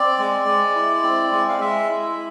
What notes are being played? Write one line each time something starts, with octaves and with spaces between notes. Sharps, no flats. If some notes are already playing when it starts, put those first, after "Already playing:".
Already playing: C4 D5
G#3
G#3
E4
C4
G#3
F5
G#3 E5
E4